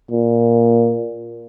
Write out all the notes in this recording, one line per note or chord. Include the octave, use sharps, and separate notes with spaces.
A#2